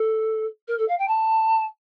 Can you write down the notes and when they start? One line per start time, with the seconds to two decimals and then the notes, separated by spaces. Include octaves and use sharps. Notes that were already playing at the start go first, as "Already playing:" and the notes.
Already playing: A4
0.67 A#4
0.77 A4
0.88 F5
0.98 G5
1.07 A5